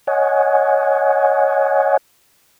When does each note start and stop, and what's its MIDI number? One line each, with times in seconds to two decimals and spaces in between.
0.07 1.97 73
0.07 1.97 75
0.07 1.97 78
0.07 1.97 80